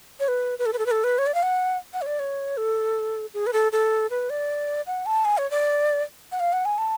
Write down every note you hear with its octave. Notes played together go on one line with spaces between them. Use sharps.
C#5
B4
B4
A4
B4
A4
B4
A4
B4
C#5
D5
F5
F#5
F#5
C#5
D5
C#5
A4
G#4
B4
A4
A4
B4
D5
F#5
A5
G#5
C#5
D5
F#5
F5
F#5
G#5
A5